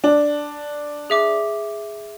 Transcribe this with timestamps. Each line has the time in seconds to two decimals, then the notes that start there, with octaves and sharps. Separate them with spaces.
0.04 D4
1.10 G#4 E5 D6